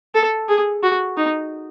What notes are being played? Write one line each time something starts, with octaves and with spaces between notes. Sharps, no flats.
A4
G#4
F#4
D#4